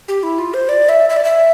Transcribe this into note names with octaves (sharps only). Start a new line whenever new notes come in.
G4
E4
F4
C5
D5
E5
E5
D5
E5